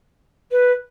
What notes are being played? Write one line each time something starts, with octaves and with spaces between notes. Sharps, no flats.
B4